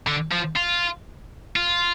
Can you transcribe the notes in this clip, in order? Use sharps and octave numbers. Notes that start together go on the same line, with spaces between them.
D3
F3
F4
F4